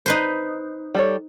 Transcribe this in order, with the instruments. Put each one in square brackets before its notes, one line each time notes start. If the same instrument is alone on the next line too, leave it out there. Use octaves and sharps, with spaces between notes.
[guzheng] D#4 B4 C5
[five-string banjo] G3 A4 C#5